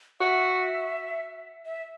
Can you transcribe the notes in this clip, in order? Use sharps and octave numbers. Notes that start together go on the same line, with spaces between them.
F#4 E5
E5